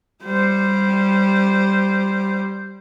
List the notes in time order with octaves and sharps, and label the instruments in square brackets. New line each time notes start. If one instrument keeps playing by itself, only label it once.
[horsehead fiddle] G3 C5